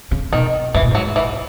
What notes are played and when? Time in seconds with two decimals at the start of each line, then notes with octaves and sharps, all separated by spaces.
0.11 C#3
0.32 B2 D#3
0.74 G#2 E3
0.83 A#2
0.91 G#2 F#3
1.16 E3